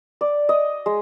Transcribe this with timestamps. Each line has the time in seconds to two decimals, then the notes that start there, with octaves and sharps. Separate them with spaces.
0.21 D5
0.49 D#5
0.86 G#3